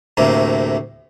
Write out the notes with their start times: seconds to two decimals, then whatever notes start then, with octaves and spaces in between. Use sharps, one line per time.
0.17 D2 A2 C3 A#3